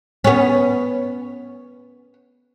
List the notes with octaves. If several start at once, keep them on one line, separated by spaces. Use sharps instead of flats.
B3 C#4